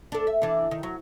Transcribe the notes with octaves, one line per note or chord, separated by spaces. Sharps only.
D4 A4
E5
E3 D4
D#3
F#3